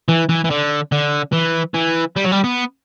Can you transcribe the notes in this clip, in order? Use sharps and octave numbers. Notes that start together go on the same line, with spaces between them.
E3
E3
E3
D3
D3
E3
E3
G3
F#3
G3
B3